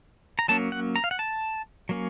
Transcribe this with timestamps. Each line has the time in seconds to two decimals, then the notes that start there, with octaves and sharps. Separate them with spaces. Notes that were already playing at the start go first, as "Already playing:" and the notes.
0.39 A#5
0.48 F#3 A#3 C#4 A5
0.72 F#5
0.96 A#5
1.04 F5
1.11 F#5
1.19 A5
1.89 F#3 A#3 C#4